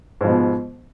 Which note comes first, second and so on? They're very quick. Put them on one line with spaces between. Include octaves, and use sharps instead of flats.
G#2 F3 B2